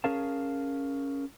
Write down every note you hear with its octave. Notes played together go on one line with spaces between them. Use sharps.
C#4 G#4 A#4 F5 A5